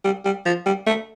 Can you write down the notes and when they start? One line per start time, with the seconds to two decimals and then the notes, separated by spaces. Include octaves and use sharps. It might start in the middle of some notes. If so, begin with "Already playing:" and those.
0.04 G3
0.25 G3
0.46 F3
0.66 G3
0.87 A3